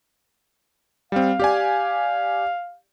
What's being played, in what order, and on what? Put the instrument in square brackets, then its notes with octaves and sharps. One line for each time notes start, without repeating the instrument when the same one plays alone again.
[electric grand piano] G3 C4 [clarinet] F5
[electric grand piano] G4 D5 G#5